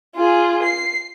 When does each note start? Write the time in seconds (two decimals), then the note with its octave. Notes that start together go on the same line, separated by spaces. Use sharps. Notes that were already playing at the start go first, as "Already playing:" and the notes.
0.15 F4 G#4
0.63 C7